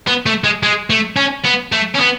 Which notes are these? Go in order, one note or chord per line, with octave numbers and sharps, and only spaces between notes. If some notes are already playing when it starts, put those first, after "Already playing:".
B3
A3
G#3
G#3
A3
C#4
B3
A3
C#4
B3